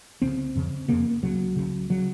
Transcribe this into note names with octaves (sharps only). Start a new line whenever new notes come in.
C#2 C#3 C4
F2 C#3
F2 C#3 A#3
C#2 C#3 F#3
C#2 C#3
C#3 F#3